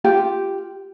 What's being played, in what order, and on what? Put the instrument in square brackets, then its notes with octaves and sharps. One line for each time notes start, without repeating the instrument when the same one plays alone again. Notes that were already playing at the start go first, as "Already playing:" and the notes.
[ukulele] F4 G4 G5